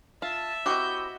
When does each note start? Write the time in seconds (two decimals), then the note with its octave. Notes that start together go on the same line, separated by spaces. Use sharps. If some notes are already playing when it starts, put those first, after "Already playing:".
0.22 F4 E5 A5
0.66 C4 E4 F#4 G4 D#5 G6